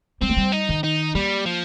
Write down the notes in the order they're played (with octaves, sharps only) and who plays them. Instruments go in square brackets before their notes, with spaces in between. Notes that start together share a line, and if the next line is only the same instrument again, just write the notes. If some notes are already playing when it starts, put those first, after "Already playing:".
[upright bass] G3 [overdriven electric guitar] C4
[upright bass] A#3
G3
[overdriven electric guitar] D#4
[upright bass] D#3
[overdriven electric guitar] D#4
[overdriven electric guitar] G3 [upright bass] A#3
[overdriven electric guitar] F3